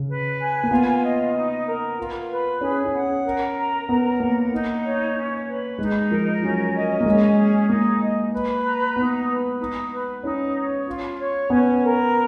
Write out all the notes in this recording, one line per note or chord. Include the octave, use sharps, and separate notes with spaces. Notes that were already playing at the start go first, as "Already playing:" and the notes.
Already playing: C#3
B4
G#5
A#3
B3 F4
D#5
D#4
A#4
F4
B4
C#4 G#4
C#4
F#5
A#4
A#5
B3 A#4
A#3 F#5
D#4
C#5
C#4
B4
G#3 D#4
F3 A#4
F#3 C#4
D#5
A#3
G#3 C#4
G#4
A#3 D#4
D#5
B4
A#5
B3 D#4
B4
D#4
B4
C#4 D#4
C#5
F4
C#5
B3 C#4
A#4